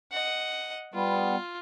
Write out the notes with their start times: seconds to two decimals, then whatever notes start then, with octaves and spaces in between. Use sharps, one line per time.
0.12 D#5 F#5
0.94 G3 B3 F4